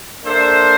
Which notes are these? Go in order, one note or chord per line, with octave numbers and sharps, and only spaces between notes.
A#3 D4 A4 C5 E5